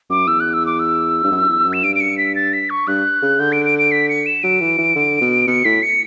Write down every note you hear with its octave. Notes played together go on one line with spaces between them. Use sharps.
F#2 D6
E2 E6
F#6
E6
D6
E6
G2
F#2
E2
F#2
E7
G2 D7
D7
C#7
B6
A6
B6
C#6
G2 F#6
C#3
D3 G6
D7
D7
D7
B6
C#7
E7
F#3 D7
E3
E3
D3
B2
B2 C#7
A2 B6
C#7